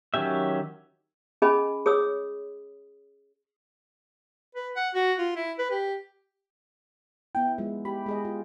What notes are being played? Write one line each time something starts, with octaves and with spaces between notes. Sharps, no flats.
D#3 F#3 C#4 G4 E5
C#4 G#4 D#5 G#5 B5
G#4 C#5 D#6 E6
B4
F#5
F#4
F4
E4
B4
G4
B3 E4 G5
F3 G#3
G4 B5
G#3 G#4 D#5
F4